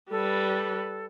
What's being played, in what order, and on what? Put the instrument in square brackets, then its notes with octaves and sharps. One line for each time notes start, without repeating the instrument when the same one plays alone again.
[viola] G3 B4 [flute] A4